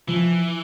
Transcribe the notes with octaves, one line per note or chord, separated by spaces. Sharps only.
E3 F3